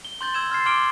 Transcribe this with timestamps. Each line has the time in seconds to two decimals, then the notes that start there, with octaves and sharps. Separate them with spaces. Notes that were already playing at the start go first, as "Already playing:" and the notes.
0.05 G7
0.21 C6 G6 A6 G7
0.34 E6 G#6 E7
0.50 C6 F6 A6 C7
0.66 C6 D6 F6 D7 G7